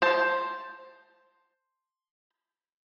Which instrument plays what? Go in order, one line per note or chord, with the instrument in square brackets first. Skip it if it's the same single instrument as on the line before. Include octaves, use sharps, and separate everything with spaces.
[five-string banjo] C5 A5